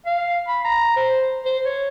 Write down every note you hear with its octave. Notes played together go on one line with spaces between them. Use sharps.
F5
B5
A#5
C5
C5
C#5